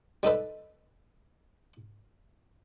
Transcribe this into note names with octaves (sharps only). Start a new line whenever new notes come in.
G3 D#4 A4 B4